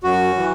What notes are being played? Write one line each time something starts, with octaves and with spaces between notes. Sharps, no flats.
F#2 F#4
E3